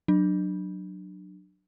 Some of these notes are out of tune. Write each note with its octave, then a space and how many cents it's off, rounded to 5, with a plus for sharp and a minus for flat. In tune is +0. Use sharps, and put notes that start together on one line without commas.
F#3 +0 D4 +25